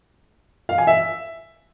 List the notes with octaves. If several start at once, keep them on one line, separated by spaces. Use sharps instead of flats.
F5
G#5
E5